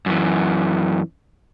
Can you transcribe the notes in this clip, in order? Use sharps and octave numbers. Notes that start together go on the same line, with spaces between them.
F#2 E3